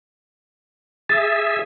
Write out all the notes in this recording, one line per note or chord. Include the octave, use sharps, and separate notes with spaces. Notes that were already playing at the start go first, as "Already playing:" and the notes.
G#4 E5 A6